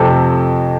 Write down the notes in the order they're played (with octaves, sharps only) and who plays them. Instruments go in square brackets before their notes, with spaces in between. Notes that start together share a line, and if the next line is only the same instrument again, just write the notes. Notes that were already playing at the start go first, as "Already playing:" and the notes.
Already playing: [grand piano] F2 C3 F3 A3 A4